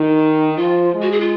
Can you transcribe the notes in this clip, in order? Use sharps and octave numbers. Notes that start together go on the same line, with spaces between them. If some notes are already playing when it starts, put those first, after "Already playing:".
Already playing: D#3 D#4
F3 F4
G#3
F#4
G#4
F4